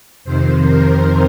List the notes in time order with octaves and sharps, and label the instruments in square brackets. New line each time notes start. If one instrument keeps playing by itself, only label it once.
[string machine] F2 C3 D#3 C5
A#4